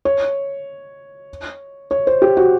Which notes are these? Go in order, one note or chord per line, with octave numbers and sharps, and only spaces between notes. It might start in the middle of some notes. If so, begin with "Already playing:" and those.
C#5
C#5
C5
G4
F#4